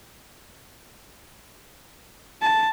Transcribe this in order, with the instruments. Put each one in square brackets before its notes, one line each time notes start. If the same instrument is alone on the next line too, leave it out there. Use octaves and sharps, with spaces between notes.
[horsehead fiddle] A5